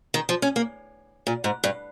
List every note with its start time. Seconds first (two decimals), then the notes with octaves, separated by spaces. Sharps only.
0.14 D#3
0.29 F3
0.42 C#4
0.56 A#3
1.27 A#2
1.44 G#2
1.64 G2